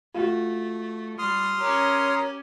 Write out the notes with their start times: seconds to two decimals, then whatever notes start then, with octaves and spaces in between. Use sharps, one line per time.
0.14 A3 F4 F#4
1.19 G3 C6 D#6 F6
1.60 C#4 G4 A#4 C#5 A#5